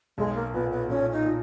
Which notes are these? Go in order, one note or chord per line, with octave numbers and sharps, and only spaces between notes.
B1 G#3
A#3
A#2 B3
B3
A#2 C#4
D#4
A#2